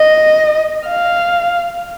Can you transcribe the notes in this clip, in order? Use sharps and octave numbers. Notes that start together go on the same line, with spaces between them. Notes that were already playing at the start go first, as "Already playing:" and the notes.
Already playing: D#5
F5